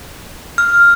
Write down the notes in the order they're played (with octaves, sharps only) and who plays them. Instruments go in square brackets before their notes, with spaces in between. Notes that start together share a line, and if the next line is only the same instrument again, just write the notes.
[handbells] F6